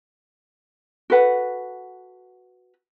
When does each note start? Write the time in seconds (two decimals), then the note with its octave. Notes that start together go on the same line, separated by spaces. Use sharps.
1.10 F#4 A4 B4 F#5